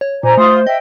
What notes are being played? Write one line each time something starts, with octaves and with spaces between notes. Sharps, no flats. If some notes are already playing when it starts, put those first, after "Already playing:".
C#5
A#2 C5 D5 G#5 A#5
A3 F4 C6 D#6
D#5 E5 G5